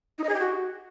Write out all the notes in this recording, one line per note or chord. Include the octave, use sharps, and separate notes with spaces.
D#4
D#5
G#4
G4
F#4